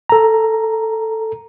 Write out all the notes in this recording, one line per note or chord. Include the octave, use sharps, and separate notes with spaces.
A4 A#5